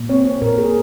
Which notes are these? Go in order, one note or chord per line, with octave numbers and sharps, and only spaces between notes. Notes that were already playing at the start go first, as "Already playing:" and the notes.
Already playing: A#2
C4 C#5
C#5
A#2 A#4
G#4